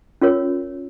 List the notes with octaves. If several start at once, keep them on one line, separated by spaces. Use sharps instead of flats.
C#4 F4 A#4 C#5